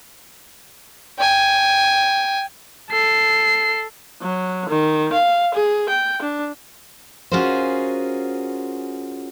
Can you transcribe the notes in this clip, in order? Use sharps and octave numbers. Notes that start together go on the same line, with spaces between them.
G5 G#5
A4 C7
F#3
D#3
F5
G#4
G5
D4
C#4 F4 F#4 G#4 A#4 C5